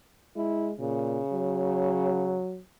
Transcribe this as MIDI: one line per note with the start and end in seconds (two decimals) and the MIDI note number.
0.36 0.73 56
0.36 0.69 64
0.80 1.20 46
0.80 2.41 49
1.33 2.60 54